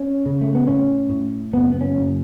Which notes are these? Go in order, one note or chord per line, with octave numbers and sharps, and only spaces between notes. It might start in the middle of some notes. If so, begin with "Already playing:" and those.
Already playing: C#4
C#3
A3
B3
A2 C#4
A2
F#1 B3
B3
C#4
F#1